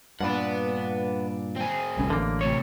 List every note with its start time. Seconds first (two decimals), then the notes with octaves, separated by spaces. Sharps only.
0.20 G2 A#2 D4 B4 F#5
1.56 C4 G#4
1.97 D1 C2 C#4
2.10 A1 D3 A#3
2.41 A2 C3 C#5